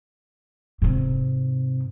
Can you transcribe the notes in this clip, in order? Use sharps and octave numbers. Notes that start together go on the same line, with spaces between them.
G#2 C3